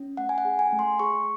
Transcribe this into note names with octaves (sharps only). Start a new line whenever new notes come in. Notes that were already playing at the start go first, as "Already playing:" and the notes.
Already playing: C#4
A3 F#5
G#5
F#5
G#4
G#5
A3
C6
G#4 C#6